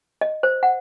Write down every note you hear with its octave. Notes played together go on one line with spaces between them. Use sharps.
D#5
C5
F#5